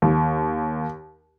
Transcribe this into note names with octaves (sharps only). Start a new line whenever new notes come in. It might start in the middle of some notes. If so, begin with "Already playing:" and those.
D#2